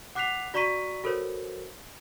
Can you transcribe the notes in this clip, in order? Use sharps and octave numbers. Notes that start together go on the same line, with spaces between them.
F#5 D6 F#6 B6 C7 F7
F#4 D5 A#5 C#6 B6 D#7
F#4 A4 A#4 C5 C#5